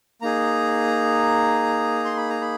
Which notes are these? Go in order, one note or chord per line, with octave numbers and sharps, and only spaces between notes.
A#3 D#4 G#4 A#5
C6
B5
A#5
B5